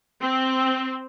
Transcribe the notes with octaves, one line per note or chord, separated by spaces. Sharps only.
C4